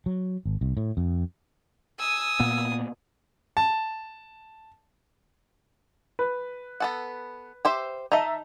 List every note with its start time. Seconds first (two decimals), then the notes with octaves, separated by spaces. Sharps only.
0.06 F#3
0.46 G#1
0.61 C2
0.77 A2
0.97 F2
1.98 G#5 D#6 E6
2.40 A#2 A#3 B3
3.57 A5
6.19 B4
6.80 B3 A4 F#5
7.65 G4 C5 E5
8.12 D#4 D#5 E5 A5 A#5